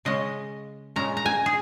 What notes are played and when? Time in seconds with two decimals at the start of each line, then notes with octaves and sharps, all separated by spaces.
0.05 C#3 G#3 C#4 D#5
0.96 A#2 G#3 C#4 A#5
1.17 A#5
1.26 G#5
1.46 G#4